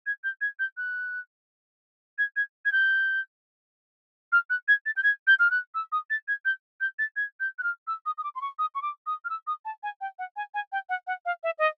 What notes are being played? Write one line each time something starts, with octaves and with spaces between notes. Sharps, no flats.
G#6
G6
G#6
G6
F#6
G#6
G#6
G#6
G6
F6
F#6
G#6
A6
G6
G#6
G6
F6
F#6
E6
D#6
A6
G#6
G6
G6
A6
G#6
G6
F#6
F6
E6
D#6
D#6
D6
C6
C#6
D#6
C#6
D6
D#6
F6
E6
D#6
A5
G#5
G5
F#5
G#5
G#5
G5
F#5
F#5
F5
E5
D#5